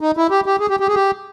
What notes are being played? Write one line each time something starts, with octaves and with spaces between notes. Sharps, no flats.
D#4
E4
G4
G4
G#4
G4
G4
G#4
G4